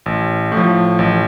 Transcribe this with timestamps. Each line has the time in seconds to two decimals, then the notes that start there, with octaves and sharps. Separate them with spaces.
0.06 A1
0.52 A2
0.57 F3
0.99 A1